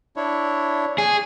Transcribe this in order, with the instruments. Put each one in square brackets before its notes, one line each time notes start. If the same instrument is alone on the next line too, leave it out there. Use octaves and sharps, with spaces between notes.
[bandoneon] D4 E4 C#5
[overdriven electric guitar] G#4